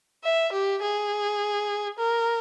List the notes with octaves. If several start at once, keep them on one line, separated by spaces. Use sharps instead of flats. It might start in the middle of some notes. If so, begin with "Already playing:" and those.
E5
G4
G#4
A#4